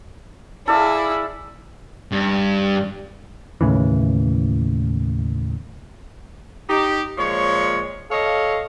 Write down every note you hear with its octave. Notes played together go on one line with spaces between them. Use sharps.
E4 G#4 A4 D5 F5
G2
D#2 A2 C#3 E3
D#4 G4
A#2 F3 G#3 C#5
A4 C#5 D#5 F5